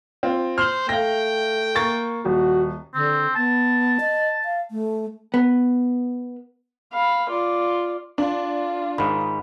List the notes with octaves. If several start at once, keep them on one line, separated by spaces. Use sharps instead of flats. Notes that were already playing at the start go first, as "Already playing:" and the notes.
C4 F4
C5 F6 F#7
A3 F5 G5 A#6
A#3 C#6 A6
D#1 F#4
D3 C4
B3 A5
D#5
F5
A3
B3
F5 B5
F4 D5
D4 F4
G#2 D#3 B5